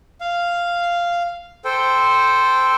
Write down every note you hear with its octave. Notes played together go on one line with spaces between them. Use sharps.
F5
A4 C5 G5